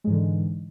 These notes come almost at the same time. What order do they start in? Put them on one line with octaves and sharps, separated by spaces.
G#3 G#2 E3 D3